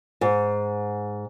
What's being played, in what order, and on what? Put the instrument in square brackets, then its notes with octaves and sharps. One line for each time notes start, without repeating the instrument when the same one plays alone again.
[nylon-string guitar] G#2